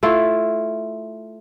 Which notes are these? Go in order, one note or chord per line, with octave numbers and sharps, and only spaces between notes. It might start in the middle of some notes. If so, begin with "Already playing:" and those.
A3 E4 F4